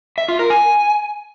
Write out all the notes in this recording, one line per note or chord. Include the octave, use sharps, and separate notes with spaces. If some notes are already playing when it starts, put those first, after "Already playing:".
E5
F4
A#4
G#5